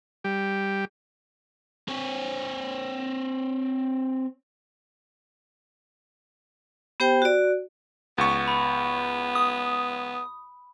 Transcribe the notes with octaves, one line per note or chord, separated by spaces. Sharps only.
G3 G4
C4 C#5
B3 G4 C5 G5
F#4 D5
C#2 B3 C#6
B5
D#6